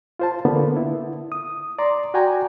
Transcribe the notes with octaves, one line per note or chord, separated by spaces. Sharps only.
F4 C5 A5
D3 A#3 B3
E4
D#6
D5 A#5 C6
F#4 D5 G5 G#5 A#5